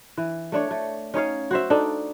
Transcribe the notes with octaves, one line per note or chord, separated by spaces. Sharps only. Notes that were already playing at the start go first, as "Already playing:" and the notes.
E3
A3 D4 C#5
A3
C#4 D#4 C#5 F5
F#4 C5 E5
D4 D#4 A4